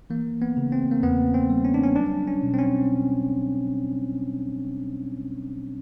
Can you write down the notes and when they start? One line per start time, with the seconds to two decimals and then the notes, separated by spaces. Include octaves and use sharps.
0.10 E3 A#3
0.42 B3
0.57 C#3
0.72 C4
0.91 A#3
1.03 E2 B3
1.34 C4
1.50 G3
1.65 C#4
1.74 D4
1.83 C#4
1.96 F#3 D4
2.28 C#4
2.43 B2
2.54 C4
2.58 C#4